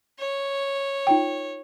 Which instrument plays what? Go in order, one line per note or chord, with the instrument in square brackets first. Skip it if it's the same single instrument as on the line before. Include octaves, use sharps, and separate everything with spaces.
[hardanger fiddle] C#5
[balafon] D#4 F4 G5